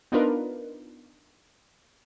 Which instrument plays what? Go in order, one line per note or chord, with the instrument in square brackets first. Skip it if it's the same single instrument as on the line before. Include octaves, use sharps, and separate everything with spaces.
[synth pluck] B3 D4 D#4 F4 A#4 B4